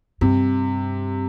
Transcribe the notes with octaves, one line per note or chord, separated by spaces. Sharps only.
G2 C3